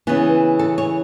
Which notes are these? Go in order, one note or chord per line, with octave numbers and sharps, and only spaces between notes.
C#3 E3 B3
A4
C#5